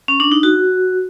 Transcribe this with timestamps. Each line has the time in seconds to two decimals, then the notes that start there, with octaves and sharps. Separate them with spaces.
0.08 C#4
0.20 D4
0.32 D#4
0.43 F#4